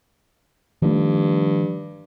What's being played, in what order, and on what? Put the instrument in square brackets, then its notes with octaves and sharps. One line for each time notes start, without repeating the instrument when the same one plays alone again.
[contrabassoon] G2 [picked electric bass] D#3 F3 A3